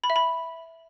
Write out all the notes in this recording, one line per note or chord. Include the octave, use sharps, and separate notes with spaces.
B5
E5
B5